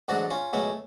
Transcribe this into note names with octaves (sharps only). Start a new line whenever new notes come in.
A1 G#2 F#3 D4 F#4
C#4 F4
C#2 B2 F#3 A3 C#4